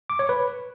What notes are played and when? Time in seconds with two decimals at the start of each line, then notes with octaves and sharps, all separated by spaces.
0.10 D6
0.19 C#5
0.29 B4